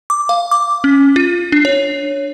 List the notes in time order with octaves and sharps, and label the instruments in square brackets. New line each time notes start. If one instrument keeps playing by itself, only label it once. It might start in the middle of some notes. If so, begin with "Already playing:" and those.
[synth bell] D6
F5
D6
C#4
F4
D4
C#5